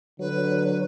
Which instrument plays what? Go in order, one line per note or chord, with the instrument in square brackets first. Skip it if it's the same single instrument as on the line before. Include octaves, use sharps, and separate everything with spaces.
[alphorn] D3 [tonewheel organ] F#3 [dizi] B4